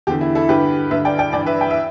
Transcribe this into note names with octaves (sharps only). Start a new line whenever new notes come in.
E2 D3 G4
E4
E4 A4
G2 D3 G4 B4
G2 D3 B4 E5
D5 G5
D5 G5
G2 E3 D5 G5
B4 E5
G5
E5